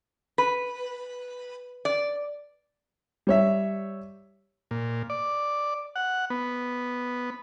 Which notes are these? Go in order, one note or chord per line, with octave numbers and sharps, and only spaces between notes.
B4
D5
G3 C#5 E5
A#2
D5
F#5
B3